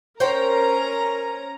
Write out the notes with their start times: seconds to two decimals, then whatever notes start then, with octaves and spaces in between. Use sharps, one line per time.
0.20 C#4 A#4 C5 C#5 G5 A#5